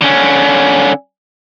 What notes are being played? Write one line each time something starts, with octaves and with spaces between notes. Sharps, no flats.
D3 C#4